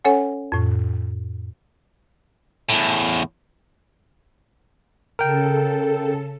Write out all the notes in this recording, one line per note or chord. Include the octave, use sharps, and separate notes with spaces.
C#4 A4 C#5 F#5 G#5
F2 A2
E2 A2
C#3 A4 A#4 G5